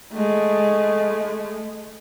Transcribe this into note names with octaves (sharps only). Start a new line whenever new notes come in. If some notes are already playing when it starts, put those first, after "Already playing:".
G#3 A3